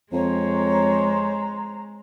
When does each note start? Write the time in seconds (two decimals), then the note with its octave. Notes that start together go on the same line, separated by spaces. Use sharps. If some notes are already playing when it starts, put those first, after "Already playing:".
0.12 F2 G#3 C5 C#5 A#5